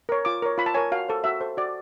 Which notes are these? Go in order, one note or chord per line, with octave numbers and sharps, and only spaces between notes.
A#4 C#5
F4 D6
A#4 C#5
F4 B5
A5
A#4 C#5 G#5
F#4 F5
A4 C5
F#4 E5
A4 C5
F#4 D5